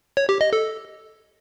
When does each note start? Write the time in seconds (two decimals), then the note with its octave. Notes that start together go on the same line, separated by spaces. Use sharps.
0.17 C#5
0.29 G4
0.41 D#5
0.53 A4